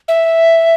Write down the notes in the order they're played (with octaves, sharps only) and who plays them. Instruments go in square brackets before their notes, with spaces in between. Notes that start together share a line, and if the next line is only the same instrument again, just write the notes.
[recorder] E5